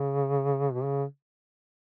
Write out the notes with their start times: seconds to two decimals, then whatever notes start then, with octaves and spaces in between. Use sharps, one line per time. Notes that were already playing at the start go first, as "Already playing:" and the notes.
Already playing: C#3
0.73 B2
0.83 C#3